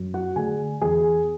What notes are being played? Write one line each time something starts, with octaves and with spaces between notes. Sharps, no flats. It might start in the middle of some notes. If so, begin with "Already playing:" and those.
Already playing: F#2
F#4 F#5
D3 A3 G#4 G#5
E2 G#4 G#5